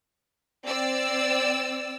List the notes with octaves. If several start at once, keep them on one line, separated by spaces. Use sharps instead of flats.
C4 D5 E6